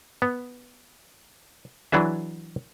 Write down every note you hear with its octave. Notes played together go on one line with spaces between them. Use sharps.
B3
E3 F#3 D4 G#4 E5